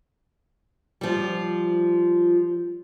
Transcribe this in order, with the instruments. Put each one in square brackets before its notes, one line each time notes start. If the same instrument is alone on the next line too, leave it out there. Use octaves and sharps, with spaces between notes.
[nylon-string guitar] F3 G3